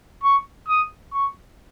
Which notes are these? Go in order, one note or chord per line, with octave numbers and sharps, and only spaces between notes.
C#6
D#6
C#6